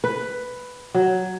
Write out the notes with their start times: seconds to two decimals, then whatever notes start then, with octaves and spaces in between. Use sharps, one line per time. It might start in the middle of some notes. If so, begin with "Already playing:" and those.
0.04 B4
0.94 F#3